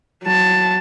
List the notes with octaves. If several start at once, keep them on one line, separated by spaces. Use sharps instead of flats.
F#3 A5